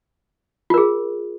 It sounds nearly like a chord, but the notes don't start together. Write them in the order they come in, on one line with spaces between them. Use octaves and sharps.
F4 A#4 G#4